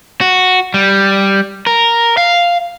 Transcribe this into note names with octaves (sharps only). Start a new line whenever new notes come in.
F#4
G3
A#4
F5